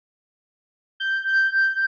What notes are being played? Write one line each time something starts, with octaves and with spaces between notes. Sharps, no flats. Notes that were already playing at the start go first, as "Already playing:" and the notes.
G6